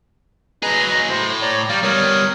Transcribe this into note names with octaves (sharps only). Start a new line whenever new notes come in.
F#3 G#4 B4 D#5 A#5
A2 C5
C#5 D5 A#5
G3 D5 F5
G3 B3 A#4 C#5 D#6